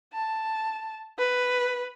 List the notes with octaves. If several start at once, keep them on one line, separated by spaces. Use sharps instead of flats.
A5
B4